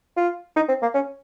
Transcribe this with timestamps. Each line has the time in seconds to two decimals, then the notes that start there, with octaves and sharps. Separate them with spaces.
0.17 F4
0.56 D#4
0.69 C4
0.82 A#3
0.94 C#4